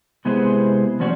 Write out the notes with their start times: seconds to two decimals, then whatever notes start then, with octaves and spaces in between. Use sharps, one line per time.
0.25 C3 G#3 B3 E4 G#4 C5
1.00 F3 A3 C#4 F#4 C5 D5